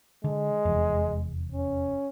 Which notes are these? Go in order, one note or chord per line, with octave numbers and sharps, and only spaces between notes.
D3 G#3
F1 E2
C#4